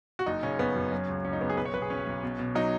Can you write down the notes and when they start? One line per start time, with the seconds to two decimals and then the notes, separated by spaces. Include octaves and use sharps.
0.19 F#4
0.26 F#1 D#4
0.43 C#3 C#4
0.59 F#2 B3
0.75 F#2
0.92 F#3 C#4
1.08 C#2
1.24 C#2 C#4
1.33 D#4
1.41 C#2 B3
1.50 G#4
1.57 B1 B4
1.65 C#5
1.74 B1 B4
1.82 G#4
1.90 B1 C#4
2.07 B1
2.23 B2
2.39 B2
2.55 F#3 D#4